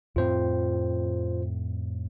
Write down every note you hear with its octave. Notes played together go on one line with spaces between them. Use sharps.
F2 A2 C4 F4 C5